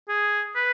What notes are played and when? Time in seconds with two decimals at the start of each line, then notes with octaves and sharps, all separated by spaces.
0.09 G#4
0.55 B4